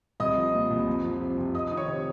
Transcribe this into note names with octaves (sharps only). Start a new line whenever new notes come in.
C2 D#5 D#6
F3
A#2
C2
F2
F3
C3
F2
F2 D#5 D#6
D#3 D#6
C#5 C#6
C3